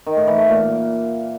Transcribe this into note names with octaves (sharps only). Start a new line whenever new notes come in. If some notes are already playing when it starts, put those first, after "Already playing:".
D#3
A2
E3
A3
A#2